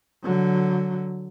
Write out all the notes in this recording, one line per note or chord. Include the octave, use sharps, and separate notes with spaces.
D3 F#3